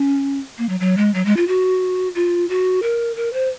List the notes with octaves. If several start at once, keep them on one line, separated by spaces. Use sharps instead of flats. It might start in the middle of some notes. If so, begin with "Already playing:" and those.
Already playing: C#4
A#3
F#3
F#3
G#3
F#3
G#3
F4
F#4
F4
F#4
A#4
A#4
C5